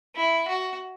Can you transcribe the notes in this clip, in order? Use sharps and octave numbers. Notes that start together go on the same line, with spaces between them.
E4
F#4